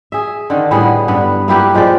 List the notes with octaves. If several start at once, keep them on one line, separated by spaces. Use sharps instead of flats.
G#4 E5
D3 D#3
A2 G3 B3 G#4
G2 B3 B4
A#3 E4 G4 B4
F3 G#3 G4 D5